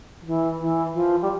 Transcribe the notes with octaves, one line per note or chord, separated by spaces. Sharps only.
F3
E3
E3
F3
G3